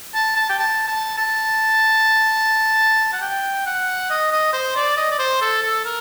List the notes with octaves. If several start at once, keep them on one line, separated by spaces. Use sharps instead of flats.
A5
A5
G5
A5
A5
A5
F#5
G5
F#5
D#5
D#5
C5
D5
D#5
D5
C5
A4
A4
A#4